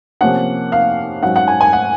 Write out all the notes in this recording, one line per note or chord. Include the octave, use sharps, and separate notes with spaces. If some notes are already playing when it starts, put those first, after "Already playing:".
C3 F3 A#3 C#4 F#5
F5
G#2 F#3 C#4 F#5
F#5
G#5
G#5
F#5